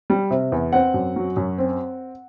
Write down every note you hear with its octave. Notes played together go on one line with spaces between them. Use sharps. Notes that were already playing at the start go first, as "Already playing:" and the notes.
G3
C3
E2
C4 F#5
F#2
F#3
F#2
C4